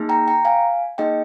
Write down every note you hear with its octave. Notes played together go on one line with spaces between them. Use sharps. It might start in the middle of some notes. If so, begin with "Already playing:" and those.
Already playing: A#3 D#4 G#4
G5 A#5
G5 A#5
F5 G#5
A#3 D#4 G#4 D#5 G5